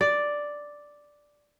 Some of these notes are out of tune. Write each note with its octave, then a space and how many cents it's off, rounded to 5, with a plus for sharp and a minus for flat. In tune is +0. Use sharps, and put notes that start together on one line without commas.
D5 +0